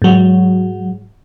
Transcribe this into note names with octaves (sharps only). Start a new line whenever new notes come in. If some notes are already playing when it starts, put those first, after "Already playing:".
G#2 F#3